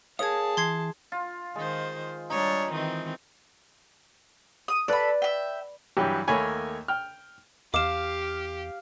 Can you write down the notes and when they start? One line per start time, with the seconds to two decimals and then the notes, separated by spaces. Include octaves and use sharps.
0.19 G#4 A#4 C#5 F5 A5 D#6 G#6
0.57 E3 C6 G#6 C7
1.12 F4
1.56 D#3 G#3 C5
2.30 G3 D4 D#4 C#5
2.72 D#3 E3 C4
4.68 D#6
4.88 A4 B4 D5 B5
5.22 E5 G5
5.97 G2 E3 F#3 G4
6.28 D#2 A3 A#3 C#5 G#5 B5
6.88 G5 F6
7.74 E2 G4 F5 D6 E7